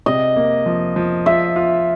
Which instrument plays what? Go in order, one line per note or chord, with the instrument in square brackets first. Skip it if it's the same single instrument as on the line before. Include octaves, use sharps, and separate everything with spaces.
[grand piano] C3 [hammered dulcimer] D#5
[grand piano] A#3
F3
F3
[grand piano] F4 [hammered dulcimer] E5
[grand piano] F4